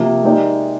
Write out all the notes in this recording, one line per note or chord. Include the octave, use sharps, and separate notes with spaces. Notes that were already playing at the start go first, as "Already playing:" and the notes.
Already playing: C3 F3 A#3
G#3 D#4 G4 A#4 D5